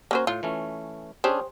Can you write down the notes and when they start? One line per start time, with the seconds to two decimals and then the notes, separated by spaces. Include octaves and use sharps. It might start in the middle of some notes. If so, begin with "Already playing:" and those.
0.11 A#3 C#4 F#4 A#4 C5
0.27 A2 F4
0.43 E3 A3 C#4
1.24 C#4 D4 G4 G#4 C5